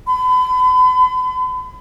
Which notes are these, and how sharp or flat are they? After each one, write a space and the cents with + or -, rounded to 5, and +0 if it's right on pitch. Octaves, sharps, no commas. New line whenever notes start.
B5 +40